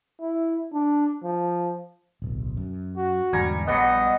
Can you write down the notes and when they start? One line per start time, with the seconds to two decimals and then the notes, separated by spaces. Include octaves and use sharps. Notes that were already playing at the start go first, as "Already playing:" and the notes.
0.21 E4
0.74 D4
1.24 F3
2.22 D1 B1
2.57 F#2
2.97 F#4
3.33 E2 G#2 D3 G3 G#5 A#5
3.67 A#1 F#3 G3 B3 D#5